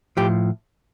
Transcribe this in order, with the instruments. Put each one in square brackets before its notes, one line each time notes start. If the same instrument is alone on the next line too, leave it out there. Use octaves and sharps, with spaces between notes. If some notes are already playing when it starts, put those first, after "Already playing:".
[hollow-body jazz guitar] A2 F3 G4